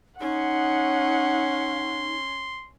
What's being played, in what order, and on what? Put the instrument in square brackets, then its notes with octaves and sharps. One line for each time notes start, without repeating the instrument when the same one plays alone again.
[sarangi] C#4 [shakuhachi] D#4 [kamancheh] F#5 [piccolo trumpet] C6